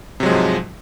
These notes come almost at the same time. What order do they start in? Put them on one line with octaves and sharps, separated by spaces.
C3 F#3 G#3 F3 G#2